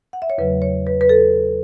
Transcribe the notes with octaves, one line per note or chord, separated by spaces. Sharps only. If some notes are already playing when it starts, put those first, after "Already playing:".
F#5
E5
C#5
E2 C#3 F#3 A3 B4
C#5
B4
B4
A4